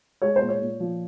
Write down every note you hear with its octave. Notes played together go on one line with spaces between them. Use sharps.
G#3 C#5
C5
A#2
C#5
A#2
F3